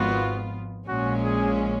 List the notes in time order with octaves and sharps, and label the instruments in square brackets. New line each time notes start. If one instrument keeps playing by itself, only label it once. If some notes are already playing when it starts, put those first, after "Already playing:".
Already playing: [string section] G#1 G#2 F3 B3 F4 [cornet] F#4
[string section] A#1 A#2 G#3 C#4 [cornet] F#4
[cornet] G#4